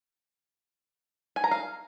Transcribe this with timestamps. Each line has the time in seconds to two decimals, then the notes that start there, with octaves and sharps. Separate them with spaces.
1.36 G#5
1.44 A#5
1.51 F5